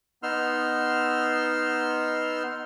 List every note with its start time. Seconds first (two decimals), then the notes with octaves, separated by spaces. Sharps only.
0.23 B3 D#4 C6 E6 F6